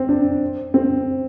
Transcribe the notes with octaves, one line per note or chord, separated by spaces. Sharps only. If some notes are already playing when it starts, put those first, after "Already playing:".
Already playing: C4
D4
C4